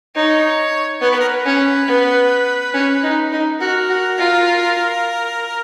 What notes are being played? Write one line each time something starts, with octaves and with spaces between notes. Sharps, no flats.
D#4 C#5
B3 C#5
B4
A#4
B4
C#4
B3
C#4
D#4
D#4
F#4 A#4
F#4
F4